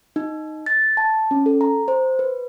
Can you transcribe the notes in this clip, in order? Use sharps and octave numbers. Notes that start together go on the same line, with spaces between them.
D#4
A6
A5
C#4
A4
A#5
C5
B4